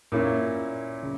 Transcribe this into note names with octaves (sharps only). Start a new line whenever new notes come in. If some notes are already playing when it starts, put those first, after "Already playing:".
A#2 A#3 C#4 E4
C#3